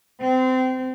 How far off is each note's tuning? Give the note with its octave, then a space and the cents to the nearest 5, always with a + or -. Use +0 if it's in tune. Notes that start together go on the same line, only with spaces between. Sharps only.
C4 -25